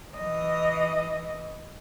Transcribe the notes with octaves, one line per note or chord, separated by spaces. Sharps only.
E3 D#5